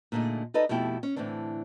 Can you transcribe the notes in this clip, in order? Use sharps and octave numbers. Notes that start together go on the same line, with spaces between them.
A#2 D3 A3 D#4 G#4
D#4 A4 B4 D5 D#5
F2 B2 A3 E4 G4 G5
C#4
A2 D3 E3 C4 D4